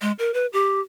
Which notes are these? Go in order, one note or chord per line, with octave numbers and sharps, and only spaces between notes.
G#3
A#4
B4
G4